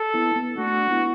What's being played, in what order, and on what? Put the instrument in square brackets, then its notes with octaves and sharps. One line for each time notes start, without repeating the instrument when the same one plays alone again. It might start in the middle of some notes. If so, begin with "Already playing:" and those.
Already playing: [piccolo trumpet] A4
[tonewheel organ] B3 E4
B3
[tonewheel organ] A3 D4 [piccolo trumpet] F#4
[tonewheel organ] B3 E4